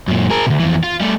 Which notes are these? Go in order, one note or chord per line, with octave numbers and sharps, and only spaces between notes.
F#2 A#2
G#4 A#4
D2 B2
F2 E3
F4
G3 A3